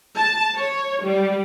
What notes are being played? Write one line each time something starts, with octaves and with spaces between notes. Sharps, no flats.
A5
C#5
G3